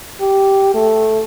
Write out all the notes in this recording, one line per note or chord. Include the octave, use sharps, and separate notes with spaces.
G4
A3